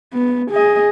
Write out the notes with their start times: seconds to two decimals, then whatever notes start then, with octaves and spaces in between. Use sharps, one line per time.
0.13 B3
0.51 G#4 D#5